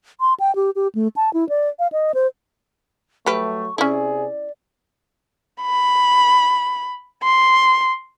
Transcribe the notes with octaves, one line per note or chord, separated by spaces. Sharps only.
C6
G5
G4
G4
A3
A5
E4
D5
F5
D#5
C5
F#3 G3 A3 G4 B4 C#6
C3 C#4 E4 G#4 D5
B5
C6